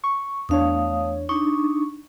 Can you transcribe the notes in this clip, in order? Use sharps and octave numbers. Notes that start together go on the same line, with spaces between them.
C#6
E2 A3 D4 C#5 F5 D#6
D4 D#4 C#6